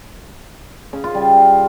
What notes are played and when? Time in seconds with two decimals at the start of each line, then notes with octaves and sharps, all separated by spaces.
0.93 C#3
1.04 F4
1.15 G3